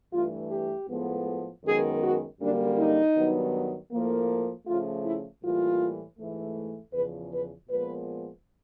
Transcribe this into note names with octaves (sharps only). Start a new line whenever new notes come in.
G2 E3 A3 F4
G4
A2 F3 G#3 B3
F#2 D#3 G#3 B3 G#4
F#4
F#2 D3 G3 A#3 D4
D#4
G2 D#3 F#3 B3
A2 F3 A#3
C#3 F3 A3 F4
E4
A2 E3 G3 A#3 F4
G#2 E3 A3
E2 C#3 F3 B4
B4
A#2 F3 G#3 B3 B4